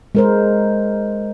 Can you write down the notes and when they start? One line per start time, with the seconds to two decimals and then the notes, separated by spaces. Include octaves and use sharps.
0.15 G#3 A#4 C5